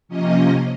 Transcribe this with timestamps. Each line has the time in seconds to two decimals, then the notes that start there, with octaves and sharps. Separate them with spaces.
0.08 C3 F3 A#3 C#4 D#5